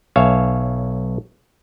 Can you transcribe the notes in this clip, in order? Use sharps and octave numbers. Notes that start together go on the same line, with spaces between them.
B1 C#5 E5 F5 G#5